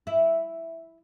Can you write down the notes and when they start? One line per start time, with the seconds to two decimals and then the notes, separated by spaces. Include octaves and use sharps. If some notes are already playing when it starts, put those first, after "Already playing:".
0.07 E4